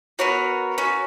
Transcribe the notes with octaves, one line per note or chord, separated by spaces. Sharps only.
B3 F#4 A#4 C#5
C#4 F#4